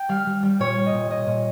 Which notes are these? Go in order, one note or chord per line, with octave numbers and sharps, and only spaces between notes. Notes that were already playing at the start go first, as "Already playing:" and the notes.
Already playing: G5
G3 F5
G3
G3
A#2 C#5
G3
D#5
A#2
A#2 D#5
A#2